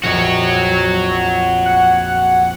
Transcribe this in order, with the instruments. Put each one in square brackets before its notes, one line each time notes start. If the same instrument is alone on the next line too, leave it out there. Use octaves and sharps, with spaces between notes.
[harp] A#1 F2 [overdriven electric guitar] F#4 C#5
[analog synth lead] F#5